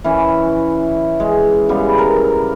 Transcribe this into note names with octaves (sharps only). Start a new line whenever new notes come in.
E3 C#4
G#3
C#3 G3 B3
A#4